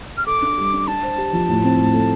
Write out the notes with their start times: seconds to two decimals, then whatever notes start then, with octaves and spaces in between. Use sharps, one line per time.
0.17 F6
0.26 A4 D6
0.42 D4
0.58 G3
0.73 D4
0.87 D4 A5
1.03 C5
1.18 G4
1.33 F3
1.49 A2
1.64 C4
1.79 A2
1.94 A3